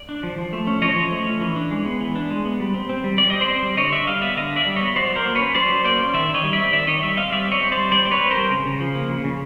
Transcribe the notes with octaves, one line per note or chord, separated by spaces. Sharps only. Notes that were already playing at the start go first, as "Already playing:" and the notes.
Already playing: D5
D4
F3
F3
A3
C#4
F3 C#5 D#5
F3
A3
C#4
E3
D4
G#3
B3
E3
D4
G#3
B3
G3
C4
C4
G3
G3 D5
C4 D#5
C5 D5
C4
G3
D3 C#5 D#5
D4 D5 E5
G3 D#5 F5
B3 D5 E5
D3 D#5 F5
D4
D5 E5
G3
B3 C#5 D#5
F#3 C5 D5
F#3
A#4 C5
A#3
C#4 B4 C#5
F#3 C5 D5
F#3
A#3 C5 D5
C#4
D#3 D5 E5
D#3
C#5 D#5
G3
D5 E5
C4
D#3 D5 E5
D#3 C#5 D#5
G3 D5 E5
C4 D#5 F5
G3 D5 E5
C4 C#5 D#5
C4
C5 D5
G3
G3 C5 D5
C4 D5
B4 C#5
C4
A#4 C5
G3
C#3
C#3
F3
A#3
C#3
C#3